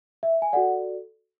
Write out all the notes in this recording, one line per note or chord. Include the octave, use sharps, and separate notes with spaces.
E5
G#5
F#4 A4 D5 F#5